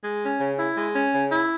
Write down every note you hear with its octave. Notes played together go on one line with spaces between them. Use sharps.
G#3
C#4
C#3
E4
G#3
C#4
C#3
E4